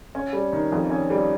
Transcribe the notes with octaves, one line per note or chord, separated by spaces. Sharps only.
C#4
G3
D#3
F2
C#4
G3